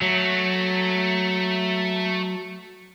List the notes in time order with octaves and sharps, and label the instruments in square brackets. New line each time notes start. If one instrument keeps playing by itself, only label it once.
[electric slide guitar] F#3 [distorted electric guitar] A3